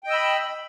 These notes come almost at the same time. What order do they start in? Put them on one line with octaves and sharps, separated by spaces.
G5 D#5 E6 B5